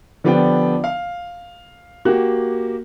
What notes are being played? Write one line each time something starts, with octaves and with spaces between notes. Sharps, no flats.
D3 F3 B3 D4 G4 G5
F5
A#3 F#4 G4 F#6